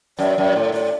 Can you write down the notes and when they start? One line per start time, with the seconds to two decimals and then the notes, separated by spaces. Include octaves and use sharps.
0.19 F#2 D5
0.38 F#2
0.56 A2
0.73 A2 D5